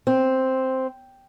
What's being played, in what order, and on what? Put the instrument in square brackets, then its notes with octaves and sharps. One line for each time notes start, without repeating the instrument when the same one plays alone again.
[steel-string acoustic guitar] C4